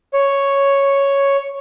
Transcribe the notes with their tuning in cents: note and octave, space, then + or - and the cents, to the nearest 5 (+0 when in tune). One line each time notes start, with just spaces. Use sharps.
C#5 +0